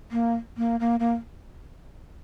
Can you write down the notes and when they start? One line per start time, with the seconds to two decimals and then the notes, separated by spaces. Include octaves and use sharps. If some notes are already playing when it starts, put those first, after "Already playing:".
0.12 A#3
0.58 A#3
0.80 A#3
1.00 A#3